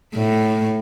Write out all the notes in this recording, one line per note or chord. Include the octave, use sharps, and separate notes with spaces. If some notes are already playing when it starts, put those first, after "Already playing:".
A2